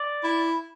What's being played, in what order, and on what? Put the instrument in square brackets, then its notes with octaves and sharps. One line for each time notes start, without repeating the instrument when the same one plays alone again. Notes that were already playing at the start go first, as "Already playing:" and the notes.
Already playing: [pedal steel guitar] D5
[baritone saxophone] E4